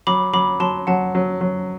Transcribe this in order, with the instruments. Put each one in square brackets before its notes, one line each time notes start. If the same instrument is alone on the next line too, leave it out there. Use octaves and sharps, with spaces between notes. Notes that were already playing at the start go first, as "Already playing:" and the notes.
[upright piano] F#3 [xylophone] B5 D6
[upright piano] F#3 [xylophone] B5 D6
[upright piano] F#3 [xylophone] A5 C6
[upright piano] F#3 [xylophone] F#5 A5
[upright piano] F#3
F#3